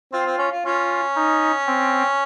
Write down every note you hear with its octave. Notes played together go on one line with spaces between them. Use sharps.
C4 F4
C4
C#4
F4
C#4 F4
D#4
C4